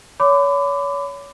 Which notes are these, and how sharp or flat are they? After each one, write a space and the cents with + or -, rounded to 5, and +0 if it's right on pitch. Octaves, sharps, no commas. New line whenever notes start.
C#5 +30 B5 +35 D6 +0